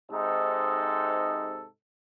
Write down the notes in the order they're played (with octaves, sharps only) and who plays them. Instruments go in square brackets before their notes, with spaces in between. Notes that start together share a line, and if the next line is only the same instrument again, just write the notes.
[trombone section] G#2 C3 D#4 A4